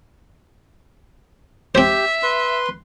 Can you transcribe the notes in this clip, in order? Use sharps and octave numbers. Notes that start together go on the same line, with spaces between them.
C4 G4 C5 E5
B4 C6